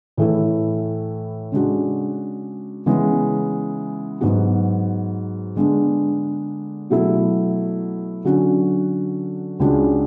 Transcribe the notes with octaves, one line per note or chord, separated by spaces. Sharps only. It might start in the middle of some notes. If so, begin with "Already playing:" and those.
A2 E3 A3 E4
C#3 G#3 D4 F#4
C#3 E3 G#3 B3
G#2 F#3 B3 F#4
D3 G#3 B3 D4
B2 F#3 A3 E4
D3 F#3 C#4 F#4
C#2 C#3 G#3 D4 F#4